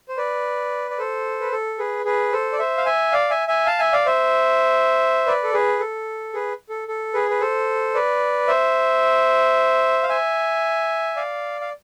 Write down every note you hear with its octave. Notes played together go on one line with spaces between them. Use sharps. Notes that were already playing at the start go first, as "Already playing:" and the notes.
C5
B4 D5
D5
A4 C5
B4
A4
G#4 B4
G#4 B4
A4 C5
D5
C5 E5
F5
E5 G#5
D5 F5
E5 G#5
E5 G#5
F5 A5
E5 G#5
D5 F5
C5 E5
B4 D5
A4
G#4 B4
A4
G#4 B4
A4
A4
G#4 B4
B4
A4 C5
B4 D5
C5 E5
F5
E5 G#5
D5 F5
F5